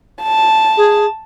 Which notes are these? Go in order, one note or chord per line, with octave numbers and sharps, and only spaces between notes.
A5
G#4